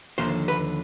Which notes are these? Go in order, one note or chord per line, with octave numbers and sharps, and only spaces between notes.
D#2 D3 F3 C5
B4